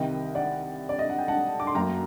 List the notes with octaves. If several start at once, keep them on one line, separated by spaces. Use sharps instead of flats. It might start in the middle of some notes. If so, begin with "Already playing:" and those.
Already playing: C2 C3 D#3 D#5 G5
D5 F#5
D5
D#5
F#5
G5
F#5 A5
D6
C6
F#2 F#3 A#3 G5 A#5